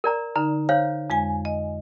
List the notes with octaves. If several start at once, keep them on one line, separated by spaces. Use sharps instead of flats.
A#4 D5 A#5
D3 D#4 A#5
C5 C#5 F5 G6
F2 G#3 G#5
D#5